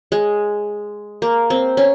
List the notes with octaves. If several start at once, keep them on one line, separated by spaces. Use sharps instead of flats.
G#3
A#3
C4
C#4